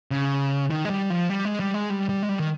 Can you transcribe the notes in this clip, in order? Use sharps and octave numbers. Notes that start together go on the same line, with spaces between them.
C#3
D#3
G#3
G3
F3
G3
G#3
G3
G#3
G3
G3
G#3
G3
D#3